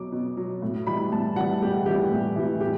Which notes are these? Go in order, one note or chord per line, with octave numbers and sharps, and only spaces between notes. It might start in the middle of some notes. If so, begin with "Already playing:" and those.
Already playing: B2 F#3 D6
B2
F#3
A2
E3 G3 B5
A2 A5
E3 G3 F#5
A2 G4
E3 G3 G4
A2
E3 G3
A2 G4